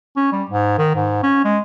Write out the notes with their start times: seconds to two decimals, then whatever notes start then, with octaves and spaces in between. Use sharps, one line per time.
0.16 C#4
0.32 G3
0.50 G#2
0.78 D#3
0.95 G#2
1.23 C#4
1.45 G#3